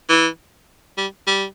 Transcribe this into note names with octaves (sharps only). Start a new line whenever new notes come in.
E3
G3
G3